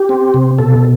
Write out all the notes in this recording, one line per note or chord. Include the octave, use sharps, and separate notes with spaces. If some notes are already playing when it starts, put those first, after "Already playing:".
Already playing: G4
C4
C3
B2 A4